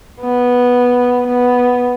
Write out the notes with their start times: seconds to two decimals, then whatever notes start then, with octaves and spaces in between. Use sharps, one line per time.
0.21 B3
1.27 B3